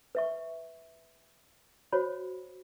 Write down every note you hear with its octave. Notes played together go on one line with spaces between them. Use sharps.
B4 E5 C#6
F#4 C5 C#5 B5